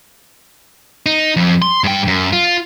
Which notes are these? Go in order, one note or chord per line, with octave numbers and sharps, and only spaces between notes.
D#4
F2
C6
G2 G5
F#2
F4